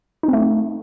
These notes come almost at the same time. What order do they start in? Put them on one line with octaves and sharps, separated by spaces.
D#4 C4 A3